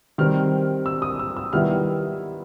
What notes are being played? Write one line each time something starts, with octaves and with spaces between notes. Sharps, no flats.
D#3 G3 C4 F6
E6
D#6
E6
E6
D#3 G3 B3 E4 F6